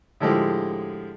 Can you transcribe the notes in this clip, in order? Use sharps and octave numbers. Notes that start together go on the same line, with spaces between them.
A2 D3 F3 G#3 G4